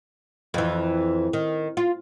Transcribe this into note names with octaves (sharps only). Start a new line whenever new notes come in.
F2 E3
D#3
F4